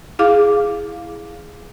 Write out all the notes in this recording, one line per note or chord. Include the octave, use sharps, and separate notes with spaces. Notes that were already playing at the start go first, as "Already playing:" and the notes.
E4 G#4 F5 D6